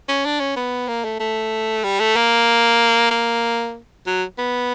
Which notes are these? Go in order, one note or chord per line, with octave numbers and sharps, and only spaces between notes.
C#4
D4
C#4
B3
A#3
A3
A3
G3
A3
A#3
A#3
F#3
B3